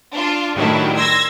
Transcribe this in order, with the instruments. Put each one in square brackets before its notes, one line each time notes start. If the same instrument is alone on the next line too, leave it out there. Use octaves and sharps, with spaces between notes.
[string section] D4 F4
A2 D#3 F#3 G3 D4 E4
C6 E6 G#6 A#6